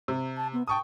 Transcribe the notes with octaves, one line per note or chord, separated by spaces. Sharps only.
C3
A5
B3
G5 A5 C#6 D#6